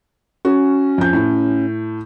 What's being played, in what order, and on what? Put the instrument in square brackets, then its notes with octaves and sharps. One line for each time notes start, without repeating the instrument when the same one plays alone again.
[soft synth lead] C#4 [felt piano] F#4
[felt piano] F2 G6
A2